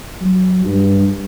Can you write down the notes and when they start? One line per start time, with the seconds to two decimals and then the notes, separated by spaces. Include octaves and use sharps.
0.21 F#3
0.64 G2